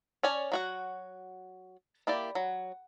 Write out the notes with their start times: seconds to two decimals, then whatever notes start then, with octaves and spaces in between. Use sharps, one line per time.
0.23 C#4 C#5 D5 G#5
0.52 F#3 F#4 F#5
2.07 A#3 E4 G4 D5
2.35 F#3